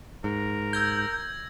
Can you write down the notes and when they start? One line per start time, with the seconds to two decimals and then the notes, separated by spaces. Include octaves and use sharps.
0.24 G#2 A#4
0.73 E6 G6 G#6 A#6